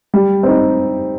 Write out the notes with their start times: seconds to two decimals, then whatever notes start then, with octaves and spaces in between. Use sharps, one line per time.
0.14 G3
0.43 C4 D#4